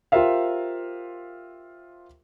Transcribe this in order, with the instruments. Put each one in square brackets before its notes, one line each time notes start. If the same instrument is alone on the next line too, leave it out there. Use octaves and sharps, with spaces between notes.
[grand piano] F4 G4 A#4 C5 E5 F5